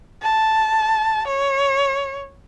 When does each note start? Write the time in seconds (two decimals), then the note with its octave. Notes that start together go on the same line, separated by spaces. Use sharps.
0.22 A5
1.27 C#5